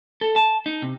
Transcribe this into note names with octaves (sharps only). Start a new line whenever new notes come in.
A4
A5
D#4
C3